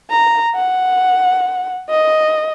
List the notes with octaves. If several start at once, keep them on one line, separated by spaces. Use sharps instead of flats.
A#5
F#5
D#5